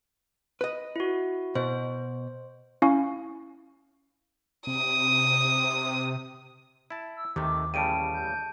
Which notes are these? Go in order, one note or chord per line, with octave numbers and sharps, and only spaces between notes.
B4 D#5
E4 F#4
B2 C5
C#4 E4 F5 G#5 C#6
C3 D#6
E4 A5
E6
D#2 C3 D#3 A3 D6
A1 C#3 G3 G5 A5 D7 D#7
G6